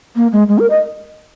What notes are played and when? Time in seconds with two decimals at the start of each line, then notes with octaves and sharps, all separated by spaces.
0.16 A#3
0.32 G#3
0.49 G#3
0.59 A#4
0.70 D#5